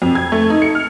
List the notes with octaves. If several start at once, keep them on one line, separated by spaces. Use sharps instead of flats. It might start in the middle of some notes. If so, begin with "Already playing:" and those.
F2
G#6
A3
D#4
C#7
F6